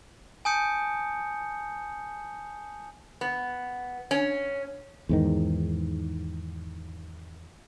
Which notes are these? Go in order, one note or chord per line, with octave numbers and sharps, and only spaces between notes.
G#5 A5 D#6 G6 C#7
B3
C#4
E2 G#2 D#3